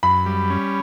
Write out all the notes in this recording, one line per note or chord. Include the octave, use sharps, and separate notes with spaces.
F#2 B5
G3
C#4